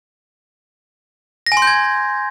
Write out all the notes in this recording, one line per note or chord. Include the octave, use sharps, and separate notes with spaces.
A#6
G#5
C6
G6
G#6